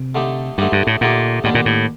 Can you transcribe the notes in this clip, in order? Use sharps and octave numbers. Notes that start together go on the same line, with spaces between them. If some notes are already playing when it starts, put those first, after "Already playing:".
Already playing: C3
D3 A3 D#4 G4
G2 D3 A3 D#4 G4
G2
A2
A#2 D3 A3 D#4 G4
D#2 A2 D3 G3 D4 G4
A#2
A2